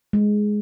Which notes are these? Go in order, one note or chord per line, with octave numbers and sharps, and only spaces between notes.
G#3